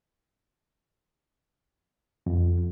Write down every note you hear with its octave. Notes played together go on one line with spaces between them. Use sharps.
F2